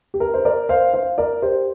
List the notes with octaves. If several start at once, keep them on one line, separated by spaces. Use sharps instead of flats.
G4
A#4
C5
A#4 D5
C5 F5
C5 F5
A#4 D5
G4 C5